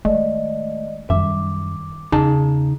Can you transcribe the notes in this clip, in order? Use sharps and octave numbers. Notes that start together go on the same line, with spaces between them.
D#3 G#3 A3 D5 D#5
F#2 D#3 G3 E5 D6
E2 C#3 D#4 G#4 A5